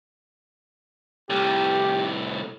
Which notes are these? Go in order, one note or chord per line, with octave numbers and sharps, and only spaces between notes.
C2 A2 G4